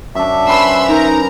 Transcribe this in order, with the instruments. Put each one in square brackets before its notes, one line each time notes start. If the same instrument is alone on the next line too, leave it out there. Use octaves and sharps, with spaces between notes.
[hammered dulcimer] F#2 D4 [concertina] E5
[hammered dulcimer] C#4 B4 C5 [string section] B5 C6 E6
[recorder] D#4 [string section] A#4 A#5